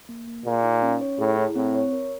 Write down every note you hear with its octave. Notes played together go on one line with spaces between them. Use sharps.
A#3
A#3
A#2 G#4
D#4
C#4
C#5
A2 G#4
E4
A2 C4
C#5
A#4